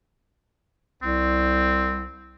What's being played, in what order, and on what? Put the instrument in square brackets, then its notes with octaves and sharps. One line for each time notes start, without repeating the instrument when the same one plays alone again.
[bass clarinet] C2 [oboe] C4